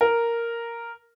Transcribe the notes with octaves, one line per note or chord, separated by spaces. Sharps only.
A#4